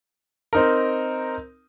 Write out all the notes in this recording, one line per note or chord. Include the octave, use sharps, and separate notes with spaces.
C4 D#4 A#4